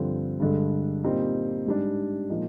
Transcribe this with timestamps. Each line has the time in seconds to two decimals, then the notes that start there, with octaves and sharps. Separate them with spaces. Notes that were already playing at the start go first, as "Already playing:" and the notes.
Already playing: G2 D3 F3 C4
0.40 G2 D3 G#3
1.04 A#2 G3 C4 D#4
1.66 G#2 G3 D4
2.29 A#2 F3 G#3 D#4